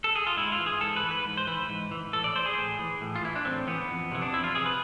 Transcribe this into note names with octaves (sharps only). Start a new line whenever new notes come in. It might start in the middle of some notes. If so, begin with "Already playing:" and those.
A4
G#4
F4
G#2 E4
F4
E3
G#4
G#2 A4
B4
E3
B4
G#2
C5
E3 B4
G#2
E3
A2 A4
D5
E3 C5
G#4
A2
E3
A2
F4
E3 E4
D4
A2 C4
E3 B3
F2
C3 E3
D4
F2 E4
F4
C3 E3 G#4
B4